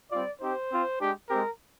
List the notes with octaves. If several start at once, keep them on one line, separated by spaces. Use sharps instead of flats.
G3 C4 F4 D5
C4 D#4 G4 C5
C4 F4
G#3 D4 G4
G#3 C4 G4 A#4